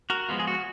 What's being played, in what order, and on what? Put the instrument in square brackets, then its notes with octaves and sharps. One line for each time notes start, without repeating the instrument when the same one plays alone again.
[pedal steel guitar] F#4 A#4
F3 G#3 B3 F4
G#4
F#4